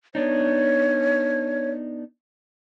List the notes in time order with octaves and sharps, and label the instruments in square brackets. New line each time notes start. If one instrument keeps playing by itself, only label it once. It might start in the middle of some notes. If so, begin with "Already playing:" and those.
[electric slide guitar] B3 D4 D#4 [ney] C#5